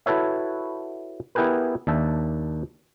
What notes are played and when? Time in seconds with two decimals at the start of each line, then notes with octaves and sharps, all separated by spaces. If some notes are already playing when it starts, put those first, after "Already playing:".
0.06 E4 F#4 A4 B4 C#5 E5
1.35 B3 E4 G4 G#4 A#4 B4
1.87 D#2 D4 E5 A5